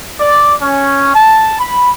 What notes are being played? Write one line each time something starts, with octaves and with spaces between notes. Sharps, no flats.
D5
C#4
A5
B5